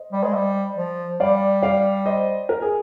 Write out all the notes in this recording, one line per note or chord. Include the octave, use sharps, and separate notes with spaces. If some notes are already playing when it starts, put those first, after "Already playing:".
Already playing: C5 D#5
G3
G#3
G3
F3
G3 D5 F5
D5 F5
C5 D#5
A#4
G#4